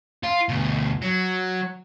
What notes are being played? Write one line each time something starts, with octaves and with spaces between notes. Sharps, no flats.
F4
D2 B2
F#3